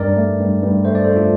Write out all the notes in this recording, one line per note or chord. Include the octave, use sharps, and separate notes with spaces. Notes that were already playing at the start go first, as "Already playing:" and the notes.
Already playing: G2 A#4 D5
A3
G2
G2
A3 C5
D5
A3 A4 C5
D4 F4